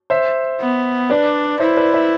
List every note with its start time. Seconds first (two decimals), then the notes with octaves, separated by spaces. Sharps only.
0.10 C5 E5
0.61 B3
1.10 D4 B4 D5
1.60 E4 C5 E5
1.77 B4 D5
1.93 C5 E5